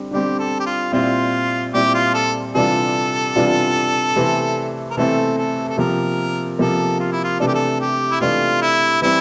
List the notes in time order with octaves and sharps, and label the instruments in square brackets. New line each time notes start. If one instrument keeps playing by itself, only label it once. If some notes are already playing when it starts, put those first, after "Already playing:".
Already playing: [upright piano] D3 G3 C4
[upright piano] D3 G3 C4 [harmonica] G4
[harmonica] A4
G4
F4
[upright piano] A#2 G3 C4 E4 [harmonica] F4
[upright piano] A#2 G3 C4 E4 [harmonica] G4
[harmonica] F4
A4
[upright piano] C3 E3 G3 D4 F4 [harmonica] A4
[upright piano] C3 E3 G3 D4 F4
C3 E3 A3 C4 E4
[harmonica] A#4
[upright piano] C3 E3 A3 C4 E4 [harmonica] A4
[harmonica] A4
A4
[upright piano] C3 F3 A#3 [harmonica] A#4
[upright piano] C3 F3 A#3 [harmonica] A4
[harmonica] F4
E4
F4
[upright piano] C3 E3 A3 D4 [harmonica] A4
[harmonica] G4
A4
G4
E4
[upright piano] C3 E3 A3 D4 [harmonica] F4
[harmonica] E4
[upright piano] E3 G3 C4 [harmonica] E4